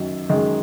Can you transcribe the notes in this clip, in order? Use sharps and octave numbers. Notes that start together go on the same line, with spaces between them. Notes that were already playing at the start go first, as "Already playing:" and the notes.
Already playing: F#2 D#3 F#3
F#2 D#3 G#3